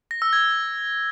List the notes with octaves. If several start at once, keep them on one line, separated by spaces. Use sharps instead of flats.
A#6
E6
G#6